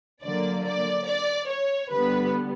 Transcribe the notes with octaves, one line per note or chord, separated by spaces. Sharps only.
D3 F#3 A#3 D5
D5
D5
C#5
D3 G3 B3 B4